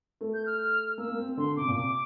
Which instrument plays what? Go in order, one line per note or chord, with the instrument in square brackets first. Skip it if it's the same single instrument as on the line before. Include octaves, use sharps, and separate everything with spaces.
[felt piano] A3
[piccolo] G6
F6
[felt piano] A#3 [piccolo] E6
[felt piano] A#3
C4
C4
[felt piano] D3 [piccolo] C6
[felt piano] C3 [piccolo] D6
[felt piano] A#2
[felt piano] C3 [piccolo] D6